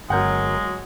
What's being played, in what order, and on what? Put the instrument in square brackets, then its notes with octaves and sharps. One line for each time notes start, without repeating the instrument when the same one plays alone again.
[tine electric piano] G1 A#4 [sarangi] F#3 [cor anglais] G#3 [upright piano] F#5 G6